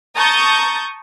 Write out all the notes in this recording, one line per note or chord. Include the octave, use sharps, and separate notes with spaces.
A5 A#5 C#6 D#6 G6 A6